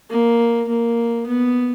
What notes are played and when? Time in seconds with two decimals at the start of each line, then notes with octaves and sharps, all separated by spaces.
0.10 A#3
0.68 A#3
1.26 B3